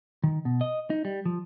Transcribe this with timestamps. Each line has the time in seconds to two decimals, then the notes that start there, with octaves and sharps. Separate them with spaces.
0.24 D#3
0.45 B2
0.61 D#5
0.90 D#4
1.05 G3
1.26 F3